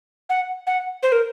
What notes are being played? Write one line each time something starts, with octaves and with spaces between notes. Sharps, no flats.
F#5
F#5
C5
A#4